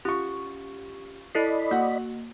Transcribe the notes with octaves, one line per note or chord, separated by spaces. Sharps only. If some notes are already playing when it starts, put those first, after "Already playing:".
C#4 F4 G4 C#6
E4 A4 D5 D#5 B5 C7
A#3 F#4 F#5